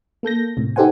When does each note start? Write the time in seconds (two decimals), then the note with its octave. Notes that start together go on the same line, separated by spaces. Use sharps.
0.23 A#3 A4 G6 A#6
0.57 A2 C3
0.76 D#4 G4 A4 C5 F#5 G#5